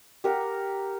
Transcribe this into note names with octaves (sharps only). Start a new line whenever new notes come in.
G4 A#4 F#5